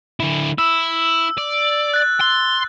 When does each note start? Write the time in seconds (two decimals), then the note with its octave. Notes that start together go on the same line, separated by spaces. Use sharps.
0.20 D3 E4
0.58 E4 E6
1.37 D5
1.94 F#6 A6
2.21 C6